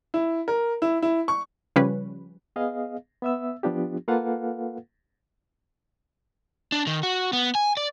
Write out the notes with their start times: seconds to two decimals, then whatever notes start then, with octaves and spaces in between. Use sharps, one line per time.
0.14 E4
0.48 A#4
0.82 E4
1.02 E4
1.28 C#6
1.76 C#3 F3 G3 C#4 B4 C#5
2.56 B3 G#4 D#5 F5
3.22 B3 E5 E6
3.63 F3 B3 D4 F4 G4
4.08 A#3 F4 A4 B4 F5 F#5
6.72 D4
6.87 D#3
7.03 F#4
7.33 B3
7.55 G#5
7.77 D5